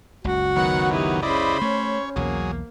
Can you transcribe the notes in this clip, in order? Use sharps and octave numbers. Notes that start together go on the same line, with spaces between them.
F#1 C#2 F#4
D#3 F#3 B3 F#5
D#4 E4 G4
C#3 E4 C5 D5 D#5 B5
A3 C#4 C#5
B1 E2 F#3 A#3 G#4